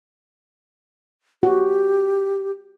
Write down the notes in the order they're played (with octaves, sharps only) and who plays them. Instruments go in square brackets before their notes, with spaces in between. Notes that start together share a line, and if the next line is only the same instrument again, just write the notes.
[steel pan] F#4 [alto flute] G4